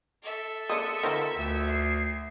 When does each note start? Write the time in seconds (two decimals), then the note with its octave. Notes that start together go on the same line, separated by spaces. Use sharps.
0.23 A4 E5
0.69 G#3 A#3 D4 D#6 C#7
1.03 D3 D#3 F3 B3 A#4
1.37 D2
1.70 C7